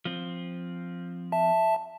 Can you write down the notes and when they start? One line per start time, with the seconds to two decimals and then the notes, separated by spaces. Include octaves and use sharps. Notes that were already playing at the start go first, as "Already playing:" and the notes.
0.05 F3 C4
1.32 E5 A5